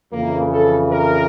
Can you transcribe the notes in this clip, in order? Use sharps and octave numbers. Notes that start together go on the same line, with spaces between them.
F2 C#3 E3 A#3
A4
A#4